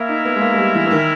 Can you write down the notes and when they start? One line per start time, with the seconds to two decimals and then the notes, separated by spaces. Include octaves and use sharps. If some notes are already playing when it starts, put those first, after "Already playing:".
Already playing: A#3 C#4 E4 A#4 E5
0.09 D#4
0.25 B3
0.36 G#3
0.41 A#3
0.54 G#3
0.58 G3
0.75 E3
0.86 E3
0.91 D#3